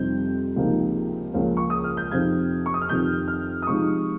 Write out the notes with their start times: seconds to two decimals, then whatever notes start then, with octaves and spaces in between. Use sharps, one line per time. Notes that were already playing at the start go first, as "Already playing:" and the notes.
Already playing: F2 C3 G3 C4 D#4 G6
0.56 C#2 C3 F3 A#3 D#4
1.33 C#2 C#3 F3 A#3 C#4
1.57 C#6
1.70 D#6
1.84 F6
1.97 G6
2.11 F2 C3 F3 C4 D#4 G#6
2.66 C#6
2.74 D#6
2.81 F6
2.89 F2 C3 D#3 G6
3.28 F6
3.62 D#6
3.67 C3 F3 G#3 D#4 C#6